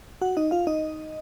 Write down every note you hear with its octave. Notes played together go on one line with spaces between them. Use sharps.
F#4 F#5
D#4 D#5
F4 F5
D#4 D#5